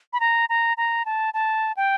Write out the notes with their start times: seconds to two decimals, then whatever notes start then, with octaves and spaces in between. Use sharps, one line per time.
0.13 B5
0.20 A#5
0.49 A#5
0.77 A#5
1.06 A5
1.34 A5
1.77 G5